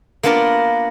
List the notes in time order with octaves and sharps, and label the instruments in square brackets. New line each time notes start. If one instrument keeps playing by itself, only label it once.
[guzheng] A#3 B3 D4 F4 A#4